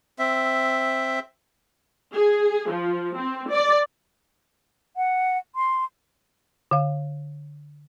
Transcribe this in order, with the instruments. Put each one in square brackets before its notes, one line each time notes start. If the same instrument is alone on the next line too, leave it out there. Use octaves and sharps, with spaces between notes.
[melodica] C4 E5
[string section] G#4
F3
C4
D5
[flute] F#5
C6
[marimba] D3 F5